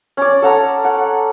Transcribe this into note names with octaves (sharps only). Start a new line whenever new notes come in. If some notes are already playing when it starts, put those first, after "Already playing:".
C#4 D5
A4 F#5 A#5
F#5